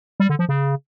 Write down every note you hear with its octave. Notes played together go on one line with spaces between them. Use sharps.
G3
D3
F3
C#3